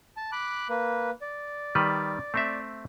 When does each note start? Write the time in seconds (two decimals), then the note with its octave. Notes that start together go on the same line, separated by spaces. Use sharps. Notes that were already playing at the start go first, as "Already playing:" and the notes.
0.17 A5
0.32 B5 D6 F#6
0.69 A#3 B4
1.21 D5
1.75 D#3 G3 B4
2.34 A3 C4 E5